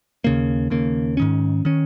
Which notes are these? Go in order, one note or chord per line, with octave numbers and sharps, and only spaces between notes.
D#2 C#3 A#3
D#2 C#3 A#3
G#2 D#3 C#4
D#3 C#4